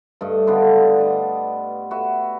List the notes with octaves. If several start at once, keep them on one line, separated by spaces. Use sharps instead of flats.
G2 A3 D#5 C#6
D3 B3 D4 F4
D5 D#5
F#4 B4 E5